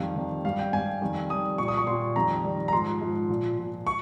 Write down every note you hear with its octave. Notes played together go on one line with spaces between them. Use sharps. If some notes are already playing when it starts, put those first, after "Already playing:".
Already playing: F2 D#3 G3 F5
F2 D#3 G3
G2 G3 F5
G5
G2 G3 G#5
F2 D#3 G3
F2 D#3 G3 D#6
A#2 G3 C#6
D#6
C#6
A#2 G3 C6
F2 D#3 G3 A#5
F2 D#3 G3
A#5
G#2 F3 C6
G#2 F3
A#2 F3
A#2 F3
C#6